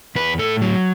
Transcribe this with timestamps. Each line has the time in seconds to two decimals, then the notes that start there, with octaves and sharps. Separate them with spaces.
0.15 E2 B4
0.39 A2 A4
0.61 F#3